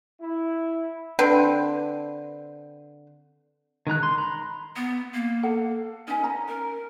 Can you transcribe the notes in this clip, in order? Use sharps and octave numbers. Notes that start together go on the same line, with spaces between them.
E4
D3 C4 B4 G5
D#3 G#3 A#5 F#6
C6
A#5 B5
B3
A#3
A4 F#5
C#4 D#4 G#5
A#5
A#4